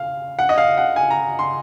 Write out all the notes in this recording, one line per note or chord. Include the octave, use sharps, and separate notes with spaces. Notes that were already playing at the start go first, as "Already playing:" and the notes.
Already playing: F5
F#5
D#5
F5
F#5
G#5
A#5
C6